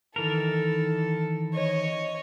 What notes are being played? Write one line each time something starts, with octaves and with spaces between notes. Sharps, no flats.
D#3 E3 A4 A#4
C#5 D#5